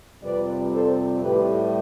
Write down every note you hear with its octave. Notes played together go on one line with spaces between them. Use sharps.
F2 C3 G3 B4 D5
A4 C5
A2 G3 G4 B4